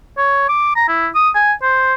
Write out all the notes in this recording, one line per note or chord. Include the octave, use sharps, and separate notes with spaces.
C#5
D6
A#5
E4
D#6
G#5
C5